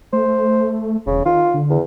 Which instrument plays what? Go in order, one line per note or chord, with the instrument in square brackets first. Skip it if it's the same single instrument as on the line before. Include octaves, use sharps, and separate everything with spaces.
[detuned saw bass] A3 [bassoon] C5
[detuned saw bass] E1 [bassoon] C#3
[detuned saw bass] D#3 [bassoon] F4
[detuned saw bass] D3
[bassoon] E2